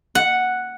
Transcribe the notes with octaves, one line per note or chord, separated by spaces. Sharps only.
F#5